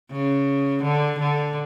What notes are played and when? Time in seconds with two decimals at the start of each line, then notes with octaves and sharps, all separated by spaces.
0.12 C#3
0.83 D3
1.19 D3